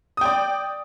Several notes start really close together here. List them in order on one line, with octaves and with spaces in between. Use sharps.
D#6 G5 D5